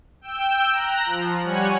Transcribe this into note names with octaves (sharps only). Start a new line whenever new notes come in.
G5 E6 G6
A#5 F#6 A#6
F3
G3 C#5 F#5 G#5 F#6